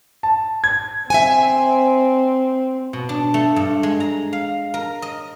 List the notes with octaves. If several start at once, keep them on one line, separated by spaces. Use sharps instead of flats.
A5
G#6
C4 E5 F#5 G#5
B2
D4
A3
G2
G#3
A#5
F5
A#4
D#5